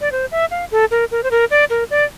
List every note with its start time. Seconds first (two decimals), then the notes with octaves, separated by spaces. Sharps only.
0.01 D5
0.12 C5
0.31 E5
0.51 F5
0.71 A4
0.91 A#4
1.11 A#4
1.23 C5
1.31 A#4
1.51 D5
1.70 A#4
1.90 D5